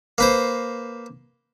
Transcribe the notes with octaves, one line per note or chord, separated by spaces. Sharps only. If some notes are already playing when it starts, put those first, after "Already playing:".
A#3 B4 C5